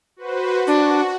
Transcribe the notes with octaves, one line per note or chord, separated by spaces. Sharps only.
F#4 B4 C5
D4 F#4